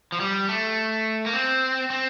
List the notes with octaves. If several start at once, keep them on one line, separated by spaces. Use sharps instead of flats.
F3
G3
A3
A#3
C4
C4